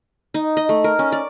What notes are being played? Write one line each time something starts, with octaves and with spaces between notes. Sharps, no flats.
D#4
D#5
A3
A#4
C#4
D5